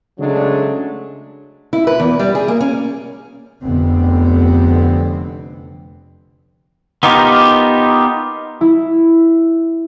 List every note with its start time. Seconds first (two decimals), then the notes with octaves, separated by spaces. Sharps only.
0.20 C#3 F#3 G#3 A3 D4
1.73 E4
1.87 B4
2.00 E2
2.19 G3
2.35 G#4
2.48 A#3
2.61 C#4
3.62 F1 F2 D3 B3 C4
7.03 B3 D#4 F4 G4 A#4
8.61 E4